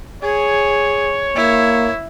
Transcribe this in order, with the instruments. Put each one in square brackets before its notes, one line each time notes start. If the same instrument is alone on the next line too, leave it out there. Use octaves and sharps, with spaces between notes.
[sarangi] G#4 [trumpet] C#5
[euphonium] A#3 [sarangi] E4